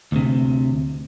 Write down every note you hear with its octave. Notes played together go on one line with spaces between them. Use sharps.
D2 C3